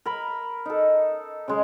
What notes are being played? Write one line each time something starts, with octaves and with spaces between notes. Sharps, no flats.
A#4 B5
D#4 A4
C#3 G#3